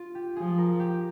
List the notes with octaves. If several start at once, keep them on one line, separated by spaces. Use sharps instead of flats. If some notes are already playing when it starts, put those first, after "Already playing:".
Already playing: F4
G4
F3 G#4
A#4
G4